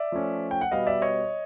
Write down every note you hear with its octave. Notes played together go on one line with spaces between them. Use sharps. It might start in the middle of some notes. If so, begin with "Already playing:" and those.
Already playing: D5 E5
F3 A3 C#4
G5
F#5
B2 G3 B3 D#5 F5
D5 E5
C#5 D#5